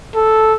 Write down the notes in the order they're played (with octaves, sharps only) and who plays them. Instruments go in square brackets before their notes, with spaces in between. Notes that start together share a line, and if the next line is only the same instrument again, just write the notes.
[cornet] A4